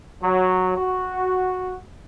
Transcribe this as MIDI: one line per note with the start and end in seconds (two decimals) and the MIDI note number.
0.23 0.76 54
0.77 1.78 66